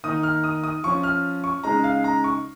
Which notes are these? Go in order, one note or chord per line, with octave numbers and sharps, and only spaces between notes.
D#3 A#3 D#4 D#6
F6
D#6
D#6
F3 C#4 C#6
F6
C#6
C#3 G#3 D#4 A#5
F5
A#5
C#6